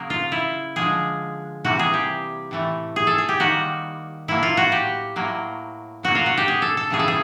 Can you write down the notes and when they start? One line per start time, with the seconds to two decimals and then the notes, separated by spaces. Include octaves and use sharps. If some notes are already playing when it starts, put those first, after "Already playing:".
Already playing: C#3 F#3 A#3
0.10 F4
0.32 E4
0.76 D3 F3 G#3 G#4
1.64 C3 E3 G3 A#3 F#4
1.79 G#4
1.94 G4
2.51 A2 E3 A3
2.96 G#4
3.07 A4
3.18 G#4
3.29 G4
3.40 D#3 G3 A#3 F#4
4.28 A2 F#3 A#3 E4
4.43 F4
4.57 F#4
4.72 G4
5.16 A2 F#3 A#3
6.03 C#3 F#3 A#3 F#4
6.15 F4
6.26 F#4
6.37 G4
6.48 G#4
6.62 A4
6.77 A4
6.90 C#3 E3 G3 A#3 G#4
6.99 A4
7.08 G#4